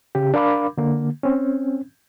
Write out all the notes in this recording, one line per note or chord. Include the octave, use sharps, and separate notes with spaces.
C#3 G4
D4 A#4 F5 B5 D6
D3 A#3
C4 C#4